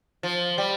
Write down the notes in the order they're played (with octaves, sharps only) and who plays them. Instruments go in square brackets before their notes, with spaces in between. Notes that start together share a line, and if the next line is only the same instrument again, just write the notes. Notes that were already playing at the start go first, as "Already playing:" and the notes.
[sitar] F3
G3